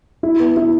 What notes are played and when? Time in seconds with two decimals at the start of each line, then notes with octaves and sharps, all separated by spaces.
0.23 E4
0.40 B3
0.57 E4